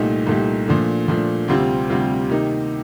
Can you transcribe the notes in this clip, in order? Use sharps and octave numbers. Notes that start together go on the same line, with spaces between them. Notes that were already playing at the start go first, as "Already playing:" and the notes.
Already playing: C2 A#2 A3 D#4 G4
C2 A#2 A3 D#4 G4
A#2 F3 A3 D4
A#2 F3 A3 D4
D2 C3 G3 C4 F4
D2 C3 G3 C4 F4
C3 D#3 A#3 D#4